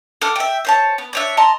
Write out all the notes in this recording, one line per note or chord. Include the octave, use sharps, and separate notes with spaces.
A4 F#5 D6 F6
E5 G5
C5 C#5 A5
B3
D4 C#5 E5
D#5 A5 A#5 C6